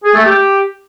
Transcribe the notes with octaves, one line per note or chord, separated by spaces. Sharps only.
G#4
A3
G4